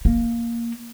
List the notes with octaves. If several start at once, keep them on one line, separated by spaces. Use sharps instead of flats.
A#3